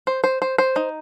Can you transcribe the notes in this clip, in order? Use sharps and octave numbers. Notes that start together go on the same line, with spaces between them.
C5
C5
C5
C5
D#4